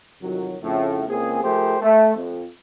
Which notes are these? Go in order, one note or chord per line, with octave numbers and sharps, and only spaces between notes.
C2 F2 D#3 F#3
F2 A2 C#3
C#2 A#3 C4 G#4
F3 A3 G4 G#4 A#4 C5
A3
F2